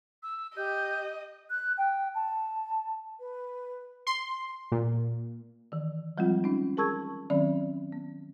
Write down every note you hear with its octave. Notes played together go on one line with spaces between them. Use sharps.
E6
G4 D#5 G6
F#6
G5
A5
B4
C6
A#2
D#3 E3
F3 G3 G#3 C4 F4
C#4 D#4
G#4 A#4 A5 C#6 E6 G#6
D#3 F#3 C4 C#4 D5
B3